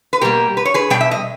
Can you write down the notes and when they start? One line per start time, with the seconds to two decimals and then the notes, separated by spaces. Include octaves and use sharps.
0.13 B4
0.21 B2 G3 A#3 G4 A#4
0.57 B4
0.65 C#5
0.74 G#4 B4
0.90 B2 G3 G5
1.01 E5
1.11 D#5